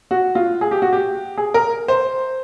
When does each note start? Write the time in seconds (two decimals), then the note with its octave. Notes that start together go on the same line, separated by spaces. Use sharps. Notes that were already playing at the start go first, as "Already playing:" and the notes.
0.11 F#4
0.35 F4
0.61 G#4
0.71 G4
0.82 F#4
0.93 G4
1.38 G#4
1.54 A#4
1.88 C5